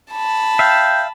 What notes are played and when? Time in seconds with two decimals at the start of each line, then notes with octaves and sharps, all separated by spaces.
0.12 A5 B5
0.59 E5 F5 G5